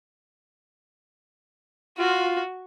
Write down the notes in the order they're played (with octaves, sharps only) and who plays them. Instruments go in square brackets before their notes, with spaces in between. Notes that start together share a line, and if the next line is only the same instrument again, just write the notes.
[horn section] F4 [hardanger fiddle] F#4